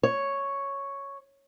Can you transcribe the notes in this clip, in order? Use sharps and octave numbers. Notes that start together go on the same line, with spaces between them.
C#5